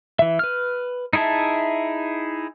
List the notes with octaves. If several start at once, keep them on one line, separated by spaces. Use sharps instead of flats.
E3 E5
B4 F6
D#4 E4 G#4 E5 A5